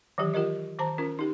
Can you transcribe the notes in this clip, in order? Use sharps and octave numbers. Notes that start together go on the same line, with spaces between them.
D#3 E3 F#3 G4
F4 G4 A#4 D#5
D#3 C5 A5 A#5
C#4 F4 A#4
D#4 G4